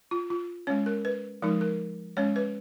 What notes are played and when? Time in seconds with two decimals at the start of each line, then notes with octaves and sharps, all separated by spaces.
0.11 F4
0.30 F4
0.67 G#3 C#4 C#5
0.86 A#4
1.05 B4
1.42 F3 G#3 D#4 A#4
1.61 A#4
2.17 G#3 C#4 C#5
2.36 B4